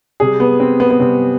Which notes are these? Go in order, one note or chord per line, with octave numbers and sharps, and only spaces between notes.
C3 G3 G#4
B3
C4
B3
B3
C3 G3 C4